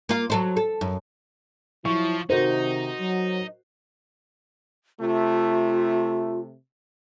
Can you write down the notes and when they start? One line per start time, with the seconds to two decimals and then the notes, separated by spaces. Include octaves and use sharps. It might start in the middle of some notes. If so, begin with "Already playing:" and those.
0.09 A#3 F4
0.30 F#3 A4 C5
0.57 A4
0.81 F#2
1.85 F3 F#3 E4 C#6
2.30 C3 D#3 D#4 F#4 A#4 C5
2.99 F#3
5.00 C3 A3 F4